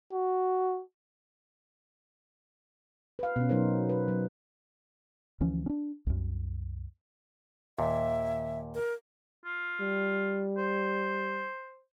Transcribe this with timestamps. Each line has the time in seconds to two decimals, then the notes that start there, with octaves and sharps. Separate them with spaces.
0.12 F#4
3.19 B4 F5
3.36 B2 C#4
3.49 F#3 D#4 A#4 C5
3.89 B4
4.08 F#3
5.41 D2 E3 F3 C#4
5.66 C#4 D4
6.07 C2 F#2
7.78 D#2 A#2 E5
8.74 A#4
9.45 F4
9.81 G3
10.57 C5